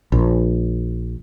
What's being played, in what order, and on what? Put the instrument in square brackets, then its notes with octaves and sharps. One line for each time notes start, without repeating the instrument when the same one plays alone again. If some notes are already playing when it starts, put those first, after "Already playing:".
[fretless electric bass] A#1